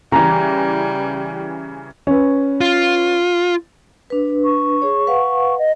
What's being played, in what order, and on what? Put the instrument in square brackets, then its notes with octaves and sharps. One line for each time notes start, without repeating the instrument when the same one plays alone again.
[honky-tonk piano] C#3 E3 [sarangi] G3 [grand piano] A#5
[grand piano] C#4 B4
[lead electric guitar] F4
[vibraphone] D4 B4
[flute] C#6
[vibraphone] G#4 C#5
B4 F5 F#5
[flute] D#5